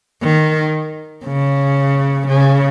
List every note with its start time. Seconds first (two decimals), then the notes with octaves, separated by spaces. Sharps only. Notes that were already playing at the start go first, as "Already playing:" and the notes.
0.23 D#3
1.25 C#3
2.28 C#3